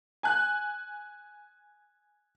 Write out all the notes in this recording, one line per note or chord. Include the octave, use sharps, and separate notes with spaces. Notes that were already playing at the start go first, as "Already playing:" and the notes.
G#5 F#6